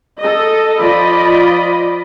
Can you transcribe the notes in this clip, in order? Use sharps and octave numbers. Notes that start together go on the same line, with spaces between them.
A4 D#5
F3 F4 D5 D#5 B5